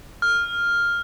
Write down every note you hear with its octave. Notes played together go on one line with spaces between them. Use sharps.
F6